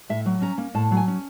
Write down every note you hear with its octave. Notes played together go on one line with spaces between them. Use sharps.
A2 E5
F#3
C#4 A#5
A#3
A2 A5
F#3
G#5
C#4